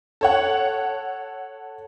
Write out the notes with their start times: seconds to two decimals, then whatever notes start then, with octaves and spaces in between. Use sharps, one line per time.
0.21 A4 C#5 F#5